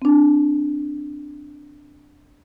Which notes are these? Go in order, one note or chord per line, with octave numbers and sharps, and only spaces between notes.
C4 D4